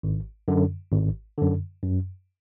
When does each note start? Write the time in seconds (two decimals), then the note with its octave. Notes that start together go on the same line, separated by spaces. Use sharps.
0.03 G#1
0.48 F#2 D3
0.92 G#1
1.38 F#2 D3
1.83 F#2